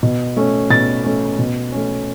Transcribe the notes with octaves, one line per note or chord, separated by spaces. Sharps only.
B2
A3 C#4
B2 A6
A3 C#4
B2
A3 C#4